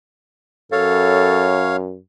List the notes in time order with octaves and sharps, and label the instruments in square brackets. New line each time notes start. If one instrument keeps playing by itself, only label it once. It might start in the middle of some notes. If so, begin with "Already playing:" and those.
[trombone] F#2 [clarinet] A4 [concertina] C#5 F5